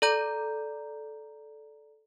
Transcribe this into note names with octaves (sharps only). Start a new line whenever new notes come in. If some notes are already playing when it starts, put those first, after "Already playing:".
A4 D5 A#5 G6